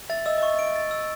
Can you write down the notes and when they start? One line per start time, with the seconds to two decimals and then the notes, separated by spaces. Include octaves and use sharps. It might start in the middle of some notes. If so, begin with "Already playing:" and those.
0.10 E5 A6
0.26 D#5 E6
0.38 D#5
0.42 E5 C#6
0.59 D#5 D7
0.76 A6
0.91 E6